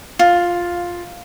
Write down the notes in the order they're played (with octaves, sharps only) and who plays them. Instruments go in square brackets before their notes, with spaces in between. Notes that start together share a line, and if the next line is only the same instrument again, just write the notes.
[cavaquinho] F4